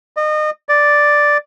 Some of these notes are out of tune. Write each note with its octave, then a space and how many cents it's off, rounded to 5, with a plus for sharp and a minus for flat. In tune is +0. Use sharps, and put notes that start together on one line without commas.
D#5 -30
D5 +0